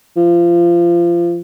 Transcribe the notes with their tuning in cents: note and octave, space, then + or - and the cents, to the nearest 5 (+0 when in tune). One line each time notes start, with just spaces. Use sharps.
F3 -25